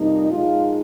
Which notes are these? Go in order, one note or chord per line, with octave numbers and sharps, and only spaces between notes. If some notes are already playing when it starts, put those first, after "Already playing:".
Already playing: F2 C3 G3 A#3 D#4
A#2 F3 G#3 D#4 F4